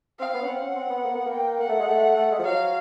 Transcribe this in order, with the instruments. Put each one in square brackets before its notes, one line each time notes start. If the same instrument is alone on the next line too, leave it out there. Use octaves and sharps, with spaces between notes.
[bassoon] C4 [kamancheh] F5
[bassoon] B3
C#4
[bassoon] C4 [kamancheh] F#5
[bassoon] C#4
C4
B3
A#3
B3
A#3
[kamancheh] G5
[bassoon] A#3 [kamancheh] F#5
[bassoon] A3
G#3
A3
A3
G#3
F3
[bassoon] F#3 [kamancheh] F5